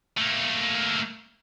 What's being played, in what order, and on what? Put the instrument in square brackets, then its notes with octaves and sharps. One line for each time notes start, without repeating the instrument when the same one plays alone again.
[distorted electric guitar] A3 A#3